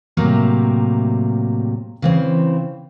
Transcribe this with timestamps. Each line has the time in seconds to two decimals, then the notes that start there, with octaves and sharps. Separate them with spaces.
0.17 A2 C3 F#3 G3 A3 A#3
2.02 C#3 E3 C4